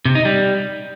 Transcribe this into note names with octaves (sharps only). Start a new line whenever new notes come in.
C3
D#4
G3